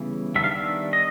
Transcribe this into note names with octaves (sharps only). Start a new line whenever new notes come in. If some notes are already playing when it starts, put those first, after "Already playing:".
Already playing: C#3 E3 G3 B3
D#3 G3 B3 D4 E5
F5
E5
D#5